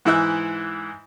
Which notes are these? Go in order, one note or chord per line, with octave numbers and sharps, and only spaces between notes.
G#2 E3 E4 E5 F#6